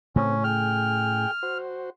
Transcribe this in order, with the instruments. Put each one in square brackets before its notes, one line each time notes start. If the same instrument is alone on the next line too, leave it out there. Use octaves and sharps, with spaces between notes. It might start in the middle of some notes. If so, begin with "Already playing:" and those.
[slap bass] A2 C#3 A3 [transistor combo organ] C4 [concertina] C#4
[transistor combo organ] G#4 G5 [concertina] F6
[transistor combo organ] F#4 C5